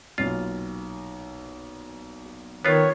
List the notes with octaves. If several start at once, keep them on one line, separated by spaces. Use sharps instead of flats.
B1 A#2 F4
D#3 B3 F4 C#5